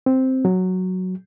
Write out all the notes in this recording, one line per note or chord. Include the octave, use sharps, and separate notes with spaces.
C4
F#3